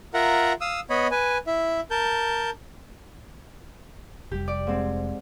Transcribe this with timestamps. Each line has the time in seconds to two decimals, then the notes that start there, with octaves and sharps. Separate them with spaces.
0.14 F4 A#4 E5 F#5 A#5
0.61 F5 D#6 E6
0.90 B3 C#5 D#5 B5
1.11 B4 G#5
1.47 E4 E5
1.91 A#4 A5 G6
4.32 F1 G3 G4
4.48 D5
4.67 G#2 C4